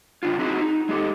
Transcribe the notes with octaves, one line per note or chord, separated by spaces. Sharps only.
C#3 D4 F4
C4 D#4 E4 F#4 G#4
D#4
G#3 G4 A4